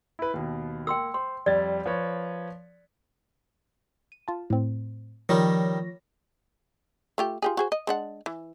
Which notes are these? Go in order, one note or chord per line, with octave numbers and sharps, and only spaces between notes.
E4 B4
D#2 B2
A#3 G5 C6 E6
C5 C6
F2 G3 D5 A6
F3 B4 C#5
D#7
F4 A5
A2 C4
D#3 F3 G3 C#5 A#6 B6
A3 F4 G4
F4 G4 G#4
F#4 G#4 C5
D#5
G#3 D4 F#5
E3